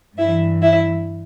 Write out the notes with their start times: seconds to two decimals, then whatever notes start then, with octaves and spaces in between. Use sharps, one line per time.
0.17 G2 E3 E4 E5
0.62 E4 E5